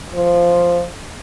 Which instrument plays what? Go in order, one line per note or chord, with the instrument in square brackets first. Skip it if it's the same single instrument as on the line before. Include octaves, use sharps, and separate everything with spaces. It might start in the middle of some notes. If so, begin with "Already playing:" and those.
[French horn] F3